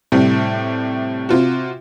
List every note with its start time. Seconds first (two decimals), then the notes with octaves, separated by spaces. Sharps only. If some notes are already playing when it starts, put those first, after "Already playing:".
0.12 A2 C3 G3
1.29 C3 F4 F#4